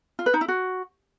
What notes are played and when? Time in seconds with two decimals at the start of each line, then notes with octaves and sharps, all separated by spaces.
0.19 F4
0.26 B4
0.34 D#4
0.41 E4
0.48 F#4